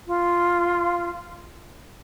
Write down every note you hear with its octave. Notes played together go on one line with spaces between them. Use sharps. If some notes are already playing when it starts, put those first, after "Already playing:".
F4